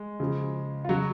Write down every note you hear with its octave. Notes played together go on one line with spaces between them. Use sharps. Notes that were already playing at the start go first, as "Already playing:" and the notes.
Already playing: G#3
C#3 F3
F4
C#3 F#3 F#4